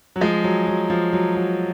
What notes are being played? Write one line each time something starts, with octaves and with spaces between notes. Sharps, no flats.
F#3
F3 G#3
F#3
F#3
F3
F#3
F#3